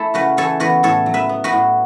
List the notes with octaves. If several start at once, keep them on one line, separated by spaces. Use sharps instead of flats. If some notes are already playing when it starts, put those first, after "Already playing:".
Already playing: A3 E4 A4
C#3 F#4 B4
E3 A4 C#5
E2 F#4 B4
A2 A4 C#5
F#3
B4 E5
B3
F#4 B4
A2